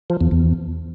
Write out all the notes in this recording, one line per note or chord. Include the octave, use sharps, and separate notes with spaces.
F3
E2
E2